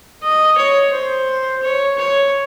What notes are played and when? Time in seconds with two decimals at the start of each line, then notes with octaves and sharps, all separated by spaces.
0.22 D#5
0.57 C#5
0.93 C5
1.63 C#5
1.98 C#5